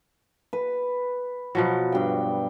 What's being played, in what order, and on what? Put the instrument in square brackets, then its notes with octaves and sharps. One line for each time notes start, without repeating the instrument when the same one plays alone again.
[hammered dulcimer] B4
[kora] B2 F3 F#3
[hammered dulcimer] G2 G5